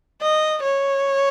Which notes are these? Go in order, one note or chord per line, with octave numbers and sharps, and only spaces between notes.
D#5
C#5